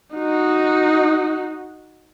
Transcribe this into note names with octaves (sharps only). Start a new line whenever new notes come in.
D#4 F#4